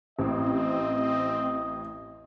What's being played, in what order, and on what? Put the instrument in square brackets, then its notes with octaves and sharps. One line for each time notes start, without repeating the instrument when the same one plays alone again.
[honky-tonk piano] A1 [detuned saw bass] C4 [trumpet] D#5